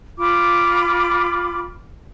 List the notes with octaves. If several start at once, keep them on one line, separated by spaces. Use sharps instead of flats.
F4 G5 B5 D6